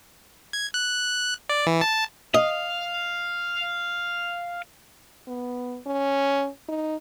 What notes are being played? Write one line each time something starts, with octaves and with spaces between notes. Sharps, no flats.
G#6
F#6
D5
E3
A5
D#5 F5
B3
C#4
D#4